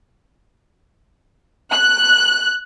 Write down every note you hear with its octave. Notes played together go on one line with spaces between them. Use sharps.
F#6